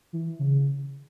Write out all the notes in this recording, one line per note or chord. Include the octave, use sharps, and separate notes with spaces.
E3
C#3